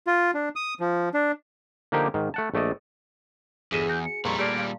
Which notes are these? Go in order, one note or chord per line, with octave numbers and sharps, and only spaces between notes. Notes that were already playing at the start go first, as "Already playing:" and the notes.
F4
D4
D#6
F3
D4
D3 F3 A#3 D#4 G4 A#4
G#2 D#3
A3 F#5 A5
A#1 A3 D5 D#5 A5
G1 E2 G#4 D#5 E5
F#4 G#5 G6
C#7
F2 A#2 G3 A#4 A#5 C6 C#6
A3 A#3 G4 D5 A5 D7
F5